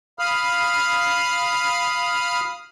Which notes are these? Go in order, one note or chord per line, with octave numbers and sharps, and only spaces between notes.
F5 B5 D#6 F6